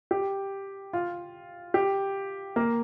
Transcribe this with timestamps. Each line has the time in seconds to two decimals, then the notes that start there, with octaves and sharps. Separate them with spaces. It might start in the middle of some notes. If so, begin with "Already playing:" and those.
0.11 G4
0.93 F4
1.74 G4
2.56 A#3